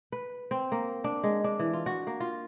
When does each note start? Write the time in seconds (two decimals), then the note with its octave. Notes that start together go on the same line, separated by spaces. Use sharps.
0.12 B4
0.51 C4
0.72 A#3
1.04 D4
1.23 G#3
1.44 D4
1.59 E3
1.73 F4
1.86 F#4
2.07 A#3
2.20 F4